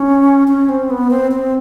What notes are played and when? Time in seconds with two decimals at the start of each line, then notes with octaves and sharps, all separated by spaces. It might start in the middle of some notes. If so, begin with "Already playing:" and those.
Already playing: C#4
0.48 C#4
0.69 C4
0.90 B3
1.10 C4
1.31 C4